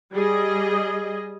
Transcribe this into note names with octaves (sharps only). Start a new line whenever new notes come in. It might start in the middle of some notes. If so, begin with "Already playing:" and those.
G3 G#4 D#5